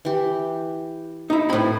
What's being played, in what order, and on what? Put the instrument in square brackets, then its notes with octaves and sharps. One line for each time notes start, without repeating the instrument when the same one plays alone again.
[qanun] E3 G4
[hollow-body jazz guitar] D#4 E4
[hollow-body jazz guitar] A2 B5 [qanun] C4 B4